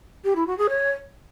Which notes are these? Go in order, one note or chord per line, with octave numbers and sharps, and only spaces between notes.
G4
E4
F#4
G#4
C#5